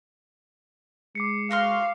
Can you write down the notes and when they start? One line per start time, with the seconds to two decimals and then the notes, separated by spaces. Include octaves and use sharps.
1.15 G#3 D6 C7 C#7
1.51 F#4 F5 C6 F6